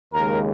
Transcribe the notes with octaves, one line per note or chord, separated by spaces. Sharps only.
D#2 C#3 G#3 A#4